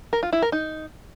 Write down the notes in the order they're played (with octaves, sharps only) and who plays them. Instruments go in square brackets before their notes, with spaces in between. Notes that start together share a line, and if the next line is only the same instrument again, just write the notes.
[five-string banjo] A#4
F4
E4
A#4
D#4